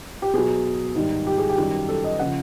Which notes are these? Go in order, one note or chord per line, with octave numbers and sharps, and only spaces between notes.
G4
B2 F#3 G#4
G#2 D#3 G3
G4
G#4
G4
F#2 D#3 G3
A4
D#5
C#3 F3 F#5